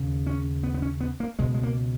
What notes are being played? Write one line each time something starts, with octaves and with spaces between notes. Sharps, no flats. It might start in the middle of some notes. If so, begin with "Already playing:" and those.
Already playing: D#2 C#3
C#4
B3
B3
C#4
B3
A#3
C#2 B2 G#3
G#3
A#3